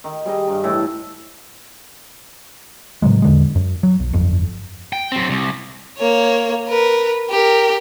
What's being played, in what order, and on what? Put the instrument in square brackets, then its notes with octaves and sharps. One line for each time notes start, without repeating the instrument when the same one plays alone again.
[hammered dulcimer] D#3
G3 G#4 D#5
G2 D#4
A2 E3
[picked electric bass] A2 C#3 F#3 G#3
E2 D3 G#3
F#2
F#3
B1
G1 F2
[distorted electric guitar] G5
F#3 C4
C2
[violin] A#3 C#5
A#4 B4
G4 A#4